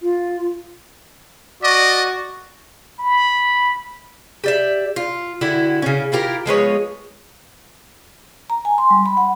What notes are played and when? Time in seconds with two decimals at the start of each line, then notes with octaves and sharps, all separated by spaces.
0.01 F4
1.63 F#4 D5 D#5
2.99 B5
4.44 G4 D5 E5
4.96 F4
5.41 D3 E4 F#4 G4
5.82 C#3 C#4
6.12 E4 F4 G4 A#4
6.46 F3 G#3 B3 C#5
8.50 A#5
8.65 G#5
8.78 C6
8.90 G3
9.06 B5
9.17 F#5